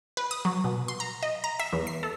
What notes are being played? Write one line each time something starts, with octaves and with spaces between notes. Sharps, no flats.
B4
D#6
F#3
B2
C6
A#5
D#5
A#5
E5
E2
C7
A4